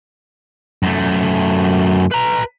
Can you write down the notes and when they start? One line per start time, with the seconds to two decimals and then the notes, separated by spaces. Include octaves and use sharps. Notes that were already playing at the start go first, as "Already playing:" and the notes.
0.83 F#2 A3
2.12 B4 A#5